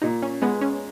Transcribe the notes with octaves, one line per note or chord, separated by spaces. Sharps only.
A#2 D#4
C#4
G#3 B3
C#4